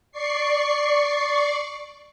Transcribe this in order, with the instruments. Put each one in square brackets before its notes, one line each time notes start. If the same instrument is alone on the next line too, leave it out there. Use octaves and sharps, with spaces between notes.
[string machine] D5 C#6 C7